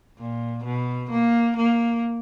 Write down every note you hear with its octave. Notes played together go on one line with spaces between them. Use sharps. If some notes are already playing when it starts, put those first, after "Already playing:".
A#2
B2
A#3
A#3